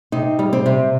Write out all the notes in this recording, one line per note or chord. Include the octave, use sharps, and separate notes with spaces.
C3 D#4
G3
C4
C3